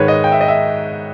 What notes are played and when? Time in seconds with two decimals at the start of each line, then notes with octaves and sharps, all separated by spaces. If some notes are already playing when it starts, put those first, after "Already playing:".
Already playing: G#2 D#3 G#3 B4 C#5
0.08 D#5
0.24 G5
0.32 E5
0.41 D#5
0.48 E5